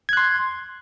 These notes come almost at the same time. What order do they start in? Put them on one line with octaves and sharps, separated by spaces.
G#6 F#6 C6